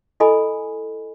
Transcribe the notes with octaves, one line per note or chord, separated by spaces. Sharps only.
E4 A4 D#5 G#5 B5